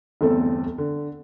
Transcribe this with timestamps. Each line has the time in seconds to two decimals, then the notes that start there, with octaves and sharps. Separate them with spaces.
0.21 G1 E2 A3 C4 A4
0.78 D3